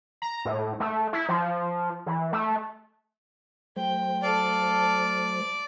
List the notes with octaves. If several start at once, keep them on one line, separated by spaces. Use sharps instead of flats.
A#5
A2
A3
E4
F3
E3
A3
F#3 A3 C5 G5
A4 D5 F5